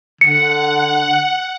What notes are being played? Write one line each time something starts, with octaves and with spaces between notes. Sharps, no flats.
D3 F#5 C#7